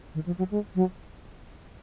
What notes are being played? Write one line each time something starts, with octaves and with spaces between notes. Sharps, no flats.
D#3
F3
F#3
G#3
F#3